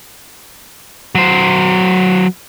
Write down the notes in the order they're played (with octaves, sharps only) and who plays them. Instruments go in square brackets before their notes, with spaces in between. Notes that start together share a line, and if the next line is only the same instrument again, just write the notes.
[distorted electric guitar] F#3 C5